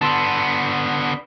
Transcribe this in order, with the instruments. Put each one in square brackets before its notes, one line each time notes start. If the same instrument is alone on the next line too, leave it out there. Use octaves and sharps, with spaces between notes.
[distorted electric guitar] D3 B3 [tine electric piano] A5 C6 E6